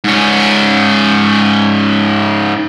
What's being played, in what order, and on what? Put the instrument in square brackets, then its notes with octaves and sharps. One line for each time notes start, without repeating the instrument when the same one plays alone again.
[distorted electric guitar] G#2 C#4